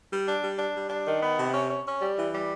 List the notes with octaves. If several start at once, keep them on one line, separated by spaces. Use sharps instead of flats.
G3
D4
G3
D4
G3
D4
D#3
B3
C3
C#4
C#4
C#4
G3
E3
G3